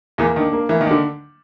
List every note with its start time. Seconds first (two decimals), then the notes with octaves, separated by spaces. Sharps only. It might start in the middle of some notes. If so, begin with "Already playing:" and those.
0.18 E2 E3 A#3
0.36 D#3 D4
0.53 A#3
0.69 E3 A#3
0.81 D#3
0.86 D3 D4